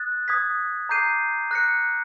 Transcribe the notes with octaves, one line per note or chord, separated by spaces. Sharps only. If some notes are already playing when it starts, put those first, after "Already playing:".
Already playing: D#6 F#6 A6
D#6 G#6 B6
A#5 D6 G6 C7 D#7
F#6 A#6 C#7